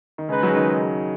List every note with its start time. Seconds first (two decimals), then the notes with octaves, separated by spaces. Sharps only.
0.18 D#3
0.29 C#3 G#3 D#4 B4
0.43 F#3
0.49 C#3
0.56 D#3